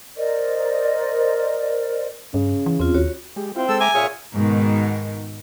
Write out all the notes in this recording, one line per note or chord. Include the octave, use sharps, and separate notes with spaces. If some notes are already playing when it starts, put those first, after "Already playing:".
A#4 C5 D5 D#5
G2 C#3
E3
E2 C4 F4
D#2 F#4 C#5
G#3 G4
C4 E4 F4
G#3 A4 E6
E5 G#5 A#5 D6
A#2 G#4 C#5 E5 F5 C#6 D#6
G#2 B2 D#3